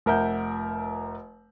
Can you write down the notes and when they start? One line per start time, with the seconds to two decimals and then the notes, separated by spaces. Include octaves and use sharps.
0.06 F1 A#4 E5 F#5 G6